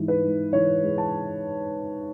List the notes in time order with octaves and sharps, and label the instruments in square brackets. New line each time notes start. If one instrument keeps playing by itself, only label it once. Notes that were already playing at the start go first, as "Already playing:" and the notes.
Already playing: [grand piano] G#2 E3
B4
G#2
E3 C#5
G#3
A5